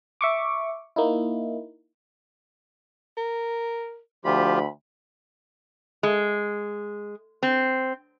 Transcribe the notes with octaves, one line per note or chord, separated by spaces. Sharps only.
E5 C#6 D6
A#3 D#4 E4
A#4
D2 F3 F4 G4 B5
G#3
C4